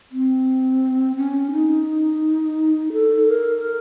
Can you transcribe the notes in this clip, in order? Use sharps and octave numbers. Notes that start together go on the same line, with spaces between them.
C4
C#4
D#4
A4
A#4